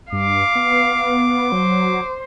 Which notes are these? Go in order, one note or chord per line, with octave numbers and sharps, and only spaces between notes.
G2 F5 D6
B3
F#3 C5